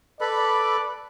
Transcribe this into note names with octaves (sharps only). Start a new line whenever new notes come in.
A4 B4 D5 B5